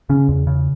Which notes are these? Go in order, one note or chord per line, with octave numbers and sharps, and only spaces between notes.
C#3 C#4
E2
C#3